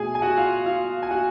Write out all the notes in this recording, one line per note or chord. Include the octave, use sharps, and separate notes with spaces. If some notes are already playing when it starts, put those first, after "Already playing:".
Already playing: B2 A3 G#4 G#5
G#5
F#4 F#5
F4 F5
F4 F5
G#5
F#4 F#5